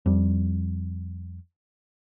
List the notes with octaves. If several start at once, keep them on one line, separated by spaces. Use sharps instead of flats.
F2 G3